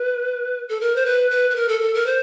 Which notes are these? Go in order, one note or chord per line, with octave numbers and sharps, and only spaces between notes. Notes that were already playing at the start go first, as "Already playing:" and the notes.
Already playing: B4
A4
A#4
C5
B4
B4
B4
A#4
A4
A4
A#4
C5